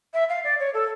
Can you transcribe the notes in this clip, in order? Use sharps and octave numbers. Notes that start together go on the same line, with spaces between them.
E5
F5
D5
C#5
A4